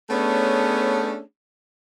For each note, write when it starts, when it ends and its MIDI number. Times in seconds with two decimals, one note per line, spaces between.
0.10 1.20 57
0.10 1.20 59
0.10 1.20 61
0.10 1.20 62
0.10 1.20 68
0.10 1.20 73